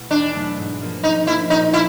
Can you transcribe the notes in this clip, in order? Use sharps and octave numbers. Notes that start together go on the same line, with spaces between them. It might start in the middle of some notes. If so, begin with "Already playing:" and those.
Already playing: B2 A3 B3 E4
E2 D4
B2 F#3 A3
G#2
F3 A#3 D4
G#2 D#4
F3 A#3 D4 E4
A#2 D#4
G3 E4